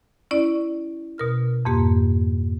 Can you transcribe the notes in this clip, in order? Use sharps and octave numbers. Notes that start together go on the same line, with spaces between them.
C#4 E4 D5
B2 A#4 F6
F2 G#2 A#3 G4